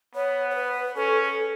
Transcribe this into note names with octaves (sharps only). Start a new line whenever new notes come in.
B3 C#5
C#5
B4
C#4 A4
A4